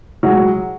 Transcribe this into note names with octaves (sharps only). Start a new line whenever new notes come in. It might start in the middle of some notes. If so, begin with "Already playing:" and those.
F#3 G#3